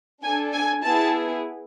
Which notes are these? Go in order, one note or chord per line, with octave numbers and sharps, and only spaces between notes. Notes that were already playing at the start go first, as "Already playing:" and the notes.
D4 A4 G#5
G#5
B3 E4 G#4 A5